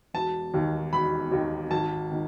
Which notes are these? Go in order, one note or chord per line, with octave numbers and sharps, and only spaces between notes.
E1 A5
D#2 D#3
E1 B5
D#2 D#3
G#1 A5
D#3